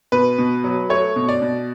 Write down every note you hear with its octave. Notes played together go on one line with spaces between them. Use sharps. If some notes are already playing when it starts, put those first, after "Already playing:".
B2 B4
B2
F#3
A3 C#5
B2
D5
B2